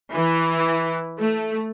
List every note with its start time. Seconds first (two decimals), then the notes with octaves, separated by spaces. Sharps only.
0.13 E3
1.18 A3